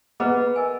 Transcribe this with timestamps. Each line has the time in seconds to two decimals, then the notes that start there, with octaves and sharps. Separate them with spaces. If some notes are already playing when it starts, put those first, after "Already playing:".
0.20 B3 G#4 B4 D#5 F#5 A#5
0.56 A#4 D#5 G#5